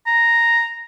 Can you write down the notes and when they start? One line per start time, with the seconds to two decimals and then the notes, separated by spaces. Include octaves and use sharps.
0.07 A#5